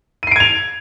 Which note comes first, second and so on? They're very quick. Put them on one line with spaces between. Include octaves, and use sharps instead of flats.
D#7 C7 D7 G#6 F7